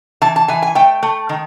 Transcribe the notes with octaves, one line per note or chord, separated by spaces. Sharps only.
E3 A5
A5
E3 G#5
G#5
A3 G5
A3
D#3